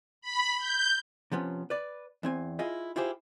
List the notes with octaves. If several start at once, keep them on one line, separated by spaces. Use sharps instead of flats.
B5
G6
C3 F3 B3 C#4
B4 D5
E2 C4 G#5
E4 F4 G#4 D#5
E4 F4 G4 G#4 C5